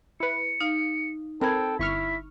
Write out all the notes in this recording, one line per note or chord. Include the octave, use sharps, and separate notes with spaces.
E4 B4 C#7
D#4 F5
C4 A4 A#4 G5 B5 G#6
G1 E4 C#6 F6 B6